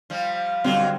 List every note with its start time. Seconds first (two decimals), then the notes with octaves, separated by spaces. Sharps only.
0.10 F3 G3
0.64 B2 D3 F#3 G3 C4 F4